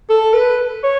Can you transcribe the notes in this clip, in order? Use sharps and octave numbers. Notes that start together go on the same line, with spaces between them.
A4
B4
C#5